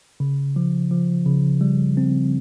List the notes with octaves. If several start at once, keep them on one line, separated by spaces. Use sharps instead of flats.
C#3
F3
F3
C#3
G3
C4